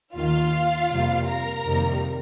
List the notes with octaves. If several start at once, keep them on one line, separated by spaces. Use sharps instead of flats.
D#2 D#3 A#3 F4 F5
F2 C3 G3 A#3
A#4 A#5
F2 C3 D#3 G3 A#3